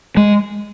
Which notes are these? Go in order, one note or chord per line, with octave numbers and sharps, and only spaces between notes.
G#3